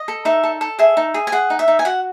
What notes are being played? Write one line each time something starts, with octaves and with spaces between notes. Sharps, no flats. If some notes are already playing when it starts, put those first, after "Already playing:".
Already playing: D#5
A4
D#4 E5
A4
A4
G#4 E5
D#4
G#4
G#5
G#4 F#5
D#4
E5
D#4
G#5
F#4 F#5